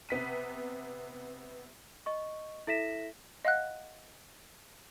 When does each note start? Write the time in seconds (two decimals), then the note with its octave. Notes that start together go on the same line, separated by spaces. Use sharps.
0.09 C3 B3 B6 D#7
2.06 D#5 C#6
2.67 E4 A4 E5 A#6 B6 E7
3.45 D#5 F5 F#5 F#6